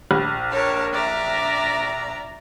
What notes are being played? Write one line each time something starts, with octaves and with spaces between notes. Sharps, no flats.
A#1
A#4 C#5 A5
D5 E5 A#5